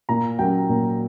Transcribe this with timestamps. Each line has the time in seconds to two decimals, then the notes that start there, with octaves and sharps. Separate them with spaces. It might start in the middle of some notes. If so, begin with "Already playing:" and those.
0.09 A#2 A#5
0.39 F#3 A#3 C#4 G5
0.69 A#2